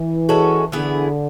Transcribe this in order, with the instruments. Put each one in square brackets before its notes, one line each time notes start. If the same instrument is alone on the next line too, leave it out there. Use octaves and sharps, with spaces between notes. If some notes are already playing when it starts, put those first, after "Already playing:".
Already playing: [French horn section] E3
[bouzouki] G#3 C#4 F#4 A4
[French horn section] D3 [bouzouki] E3 B3 E4 G#4